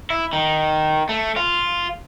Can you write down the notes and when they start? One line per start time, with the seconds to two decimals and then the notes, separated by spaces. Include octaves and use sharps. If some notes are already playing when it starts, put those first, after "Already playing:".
0.10 E4
0.33 D#3
1.09 A3
1.37 F4